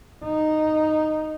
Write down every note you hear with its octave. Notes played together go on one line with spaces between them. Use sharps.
D#4